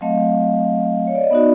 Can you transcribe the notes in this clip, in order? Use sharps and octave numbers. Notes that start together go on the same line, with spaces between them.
F#3 A3 C4 D#5 F5
C#5
D5
D#5
B3 D#4 F#4 D5 E5